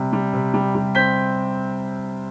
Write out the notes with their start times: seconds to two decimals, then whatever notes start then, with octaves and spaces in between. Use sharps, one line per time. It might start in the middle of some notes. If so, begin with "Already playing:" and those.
Already playing: C3 G3
0.13 G3
0.33 C3
0.54 G3
0.75 G3
0.95 C4 G6 B6